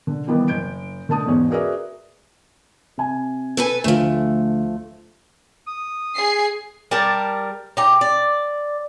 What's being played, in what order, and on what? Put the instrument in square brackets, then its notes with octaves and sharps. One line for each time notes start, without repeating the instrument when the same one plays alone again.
[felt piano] D3
B2 D#3 E3 G3 A#3 B3
F#1 G6 D7
D3 A3 A5 D#6
E2 G#2 B2 C#4 C#5
F#4 G#4 A#4 B4 D5 E5
C3 G#5
[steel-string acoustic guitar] A4 B4 G#5
[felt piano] D2 [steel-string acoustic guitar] F3 A3
[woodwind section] D#6
[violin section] G#4 C7
[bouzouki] G3 A#4 A5
D#4 G4
D5